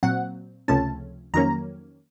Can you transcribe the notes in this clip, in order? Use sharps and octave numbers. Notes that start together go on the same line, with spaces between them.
A#2 F#3 C4 F#5
C#2 C3 F3 A3 C#4 A5
F2 D#3 F#3 A#3 C#4 A#5